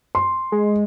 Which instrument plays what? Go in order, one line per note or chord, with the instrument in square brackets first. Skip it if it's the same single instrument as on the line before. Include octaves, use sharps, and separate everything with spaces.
[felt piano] C6
[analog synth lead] G#3